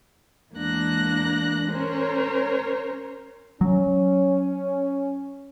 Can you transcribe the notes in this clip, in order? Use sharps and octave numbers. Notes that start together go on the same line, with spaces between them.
E2 G#3 A#3 D4 F#6 A#6
C#4 A#4 C5 C#5
F#3 C#4